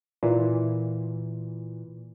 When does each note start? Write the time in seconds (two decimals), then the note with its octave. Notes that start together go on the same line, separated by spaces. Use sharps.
0.23 A#2 E3